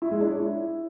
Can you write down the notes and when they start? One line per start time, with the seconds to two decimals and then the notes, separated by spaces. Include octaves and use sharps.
0.02 E4
0.11 G#3
0.21 D4
0.30 C#5
0.40 E4